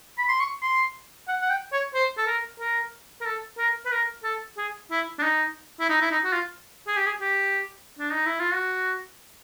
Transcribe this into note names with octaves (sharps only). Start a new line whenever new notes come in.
B5
C6
C#6
C6
F#5
F#5
G5
C#5
C5
A4
A#4
A#4
A#4
A4
A#4
B4
A#4
A4
G#4
E4
D4
D#4
E4
D#4
E4
D#4
F#4
F4
G#4
G4
G#4
G4
D4
D#4
E4
F4
F#4